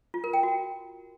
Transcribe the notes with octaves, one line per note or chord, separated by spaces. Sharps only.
F4
A#4
G5
F#4